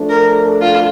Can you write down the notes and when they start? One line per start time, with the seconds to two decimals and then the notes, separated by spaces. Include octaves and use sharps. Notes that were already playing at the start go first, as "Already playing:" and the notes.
Already playing: F3 A3 D4 A4
0.09 A#4
0.61 F4